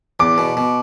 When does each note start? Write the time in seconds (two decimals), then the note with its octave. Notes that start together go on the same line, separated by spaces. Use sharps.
0.20 E2 D6
0.38 B2
0.57 B2